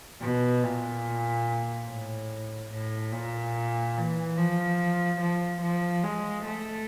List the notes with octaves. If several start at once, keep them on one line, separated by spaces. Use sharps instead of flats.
B2
A#2
A2
A2
A#2
E3
F3
F3
F3
G#3
A3